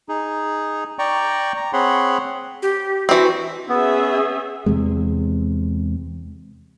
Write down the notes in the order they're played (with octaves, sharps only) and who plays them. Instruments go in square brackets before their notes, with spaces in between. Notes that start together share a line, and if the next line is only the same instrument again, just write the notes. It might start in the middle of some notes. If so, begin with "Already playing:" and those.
[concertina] D#4 G#4
D5 G5 A#5 C#6
A#5
C4 G#4 C#5 F#5 B5 C6
[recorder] G4
[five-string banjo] E3 C4 [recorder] F#4
[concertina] B3 [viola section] C#4 G#4 E5
[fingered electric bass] E2 C3 G#3